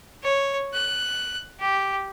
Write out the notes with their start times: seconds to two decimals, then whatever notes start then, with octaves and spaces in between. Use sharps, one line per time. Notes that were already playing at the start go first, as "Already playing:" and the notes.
0.23 C#5
0.74 F#6
1.60 G4